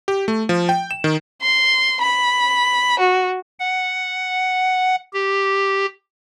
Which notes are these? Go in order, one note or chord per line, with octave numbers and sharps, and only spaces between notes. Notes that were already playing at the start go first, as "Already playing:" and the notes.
G4
A3
F3
G5
E7
D#3
C6
B5
F#4
F#5
G4